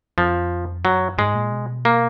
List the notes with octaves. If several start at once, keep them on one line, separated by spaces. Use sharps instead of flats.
F2 F3
F#2 F#3
G#2 G#3
A#2
B2
A#3